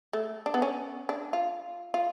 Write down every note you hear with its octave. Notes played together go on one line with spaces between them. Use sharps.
A3
D4
B3
C#4
D4
F4
F4